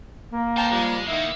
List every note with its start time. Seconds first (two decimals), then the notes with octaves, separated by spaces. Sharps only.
0.31 A#3
0.57 A2 C5 G5 A5 A#5
0.71 F3 G3 G#3
1.07 D#3 A#3 B3 E4